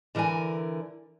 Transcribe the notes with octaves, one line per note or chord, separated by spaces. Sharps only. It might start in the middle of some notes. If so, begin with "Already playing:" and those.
D3 E3 A#4 D5 G#5